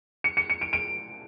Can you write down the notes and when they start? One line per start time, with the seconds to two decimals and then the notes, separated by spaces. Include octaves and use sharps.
0.24 C#7
0.37 C#7
0.50 C#7
0.61 D7
0.73 D7